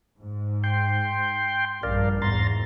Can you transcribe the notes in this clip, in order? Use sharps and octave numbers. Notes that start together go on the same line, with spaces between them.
G#2
G5 C6
A#1 G2 A#4 D5 F5
E2 G#2 A#5 C6 A6